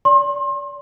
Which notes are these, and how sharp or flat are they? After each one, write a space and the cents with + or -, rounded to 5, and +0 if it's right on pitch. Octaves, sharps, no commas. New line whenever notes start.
D5 -30 C6 +35